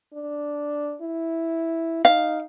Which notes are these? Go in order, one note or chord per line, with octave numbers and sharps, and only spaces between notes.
D4
E4
D#4 F5